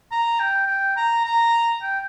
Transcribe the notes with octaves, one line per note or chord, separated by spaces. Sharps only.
A#5
G5
G5
A#5
A#5
G5